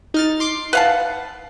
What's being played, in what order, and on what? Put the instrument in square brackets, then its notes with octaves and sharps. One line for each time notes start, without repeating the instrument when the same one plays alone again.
[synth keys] D#4 F6 A6
C6 D6 C7
[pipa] B4 F5 A5 [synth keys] F#5